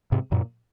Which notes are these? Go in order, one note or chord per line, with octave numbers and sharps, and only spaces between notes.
G#2 C3
F#2 A#2